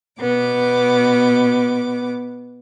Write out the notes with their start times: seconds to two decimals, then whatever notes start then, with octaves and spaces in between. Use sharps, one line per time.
0.19 B2 B3 D6